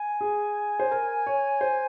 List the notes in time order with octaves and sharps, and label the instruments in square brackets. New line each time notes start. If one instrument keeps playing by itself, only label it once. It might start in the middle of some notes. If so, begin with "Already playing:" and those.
Already playing: [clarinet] G#5
[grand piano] G#4
C5
A#4
C#5
C5